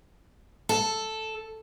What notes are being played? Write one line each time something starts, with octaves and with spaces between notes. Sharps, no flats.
A4